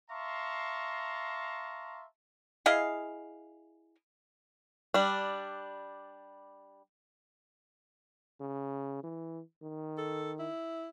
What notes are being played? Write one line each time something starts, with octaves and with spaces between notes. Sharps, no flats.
E5 F5 A5 A#5 C6 C#6
E4 G#4 D#5 F5
G3 D4
C#3
E3
D#3
A4
E4